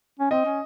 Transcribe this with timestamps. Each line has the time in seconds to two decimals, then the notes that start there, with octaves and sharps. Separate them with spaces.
0.19 C#4
0.31 C4 D#5
0.45 C#4